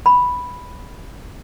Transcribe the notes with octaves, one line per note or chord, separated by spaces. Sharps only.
B5